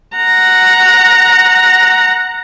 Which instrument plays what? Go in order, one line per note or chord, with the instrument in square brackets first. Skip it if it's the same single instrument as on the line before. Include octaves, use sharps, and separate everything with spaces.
[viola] F#5 A#5